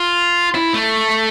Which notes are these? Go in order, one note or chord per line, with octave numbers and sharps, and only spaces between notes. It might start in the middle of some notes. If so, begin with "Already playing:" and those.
Already playing: F4
E4
A3